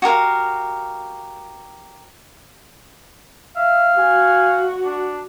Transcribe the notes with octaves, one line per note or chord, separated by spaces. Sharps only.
F#4 G4 A#4 F5
E5 F5
F#4 G#5
D4